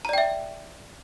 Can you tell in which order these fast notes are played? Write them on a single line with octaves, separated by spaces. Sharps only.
A#5 D5 G5 E5